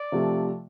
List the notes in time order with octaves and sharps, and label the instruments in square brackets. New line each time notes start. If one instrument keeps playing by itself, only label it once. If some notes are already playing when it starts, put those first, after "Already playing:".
Already playing: [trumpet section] D5
[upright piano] C3 F3 A3